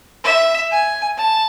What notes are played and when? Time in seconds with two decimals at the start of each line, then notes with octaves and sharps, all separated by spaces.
0.24 E5
0.71 G#5
1.18 A5